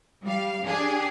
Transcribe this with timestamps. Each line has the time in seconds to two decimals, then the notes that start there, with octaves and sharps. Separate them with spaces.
0.24 G3 F5
0.66 D4 G4 G#4